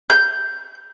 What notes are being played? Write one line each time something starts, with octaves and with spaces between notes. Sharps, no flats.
G6